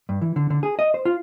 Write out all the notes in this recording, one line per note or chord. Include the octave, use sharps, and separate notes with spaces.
G2
E3
D3
D3
G#4
D#5
C5
F4